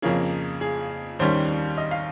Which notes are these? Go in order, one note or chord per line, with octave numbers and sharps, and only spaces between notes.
F2 C#3 F3 A#3 C#4 G#4
G#4
D#2 D#3 G3 C#4 C5
D#5
F5